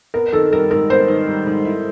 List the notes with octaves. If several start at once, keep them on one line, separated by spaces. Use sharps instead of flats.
B3 A#4
D#3 A4
G3 A#4
G#2 A#4
B3 C5
D#3
G3
G#2
E4